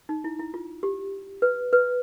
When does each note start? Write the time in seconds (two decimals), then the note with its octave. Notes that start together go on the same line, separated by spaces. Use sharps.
0.09 D#4
0.24 E4
0.39 E4
0.54 F4
0.83 G4
1.42 B4
1.73 B4